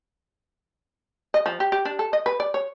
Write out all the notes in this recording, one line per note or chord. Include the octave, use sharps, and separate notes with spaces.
D#5
F3
G4
G4
D4
A4
D#5
B4
D5
C#5